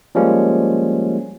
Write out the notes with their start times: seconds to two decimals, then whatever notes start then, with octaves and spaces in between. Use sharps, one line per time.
0.15 F3 G3 G#3 A#3 C#4